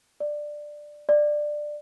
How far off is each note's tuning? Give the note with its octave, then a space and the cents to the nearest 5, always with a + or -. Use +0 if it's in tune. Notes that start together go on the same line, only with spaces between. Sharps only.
D5 +10
D5 +15